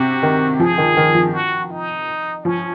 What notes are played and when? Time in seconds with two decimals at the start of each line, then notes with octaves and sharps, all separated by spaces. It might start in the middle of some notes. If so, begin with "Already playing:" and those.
Already playing: C3 F#4
0.23 D#3
0.59 F3 G#4
0.78 D#3
0.97 D#3
1.15 F3
1.33 F#4
1.70 D#4
2.44 F3 C#4